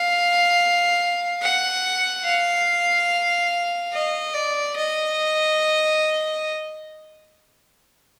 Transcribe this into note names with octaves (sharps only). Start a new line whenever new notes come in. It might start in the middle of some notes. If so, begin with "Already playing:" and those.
Already playing: F5
F#5
F5
D#5
D5
D#5